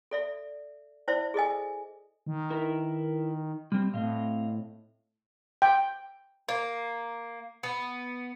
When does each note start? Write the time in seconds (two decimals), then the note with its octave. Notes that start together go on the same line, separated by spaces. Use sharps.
0.11 A4 D5 E5
1.08 E4 C5 D5 E5
1.34 G#4 A4 D#5 G#5
2.26 D#3
2.50 E4 A#4 B4
3.72 G3 C4
3.94 A2 C4 D#5 F5
5.62 G5
6.49 A#3
7.63 B3